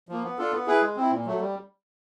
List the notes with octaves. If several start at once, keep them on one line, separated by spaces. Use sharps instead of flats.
F3 A#3
B3
D4 F4 A4
B3
E4 G#4 B4
G#3
C4 E4
A#2
F#3 A3
G3